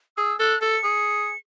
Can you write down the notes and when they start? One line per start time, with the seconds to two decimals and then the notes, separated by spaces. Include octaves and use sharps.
0.17 G#4 E6
0.40 A4 F#6
0.61 A4 C#7
0.84 G#4